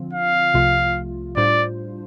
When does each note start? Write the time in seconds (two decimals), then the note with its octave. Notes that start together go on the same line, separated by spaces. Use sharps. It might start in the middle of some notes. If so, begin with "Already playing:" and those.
Already playing: D3 F3 C4 F4
0.13 F5
0.54 C2 C3 F3 A3 F4
1.36 A2 G3 D4 F4 C5 D5